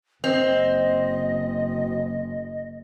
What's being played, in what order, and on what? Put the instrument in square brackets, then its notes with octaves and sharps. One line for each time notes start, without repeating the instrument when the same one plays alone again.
[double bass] F#1 [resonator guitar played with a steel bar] C4 [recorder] D#5